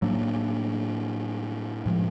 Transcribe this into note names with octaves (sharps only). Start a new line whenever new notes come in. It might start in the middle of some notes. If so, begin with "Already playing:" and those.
A2 F#3 A#3 D4
A2 F3 G#3